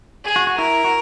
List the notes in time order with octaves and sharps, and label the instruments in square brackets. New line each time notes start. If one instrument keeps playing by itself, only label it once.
[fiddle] G#4
[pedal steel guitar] F#4
F#4
[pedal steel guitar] E4 [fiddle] A#4
[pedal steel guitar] F#4